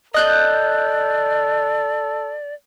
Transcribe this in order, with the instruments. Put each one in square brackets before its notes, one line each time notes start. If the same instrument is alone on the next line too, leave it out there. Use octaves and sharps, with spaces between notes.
[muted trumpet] A4 [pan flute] D5 [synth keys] D#5 F#6 G6